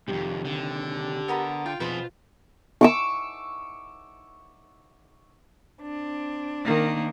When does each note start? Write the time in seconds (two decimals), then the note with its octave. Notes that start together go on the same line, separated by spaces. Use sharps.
0.08 F2 G#2 C3 D#3 G4
0.45 D3
1.28 B3 A#4 B5
1.66 F4 G5
1.80 F2 B2 F4 G#4 B4 C5
2.81 C#6 D6 E6
5.81 C4 D4
6.65 D#3 A#3